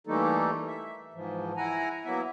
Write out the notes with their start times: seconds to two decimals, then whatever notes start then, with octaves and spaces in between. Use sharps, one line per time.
0.07 E3 G3 A3 A#3 D#4 A4
0.67 E5
1.14 G#2 E3 F3
1.57 E4 F#5 G#5 A#5
2.05 F#3 A#3 B3 E4 E5